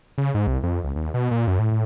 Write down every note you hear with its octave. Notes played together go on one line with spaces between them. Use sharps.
C#3
G#2
C2
F2
C#2
D#2
B2
A#2
F#2
A2
A2